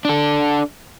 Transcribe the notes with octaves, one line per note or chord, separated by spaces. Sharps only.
D4 A4